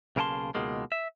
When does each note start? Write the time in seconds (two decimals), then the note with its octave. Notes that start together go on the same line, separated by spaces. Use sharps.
0.16 B1 C#3 A#3 G5 A5 C6
0.55 C#2 B2 D#3 G#3 A#3
0.92 E5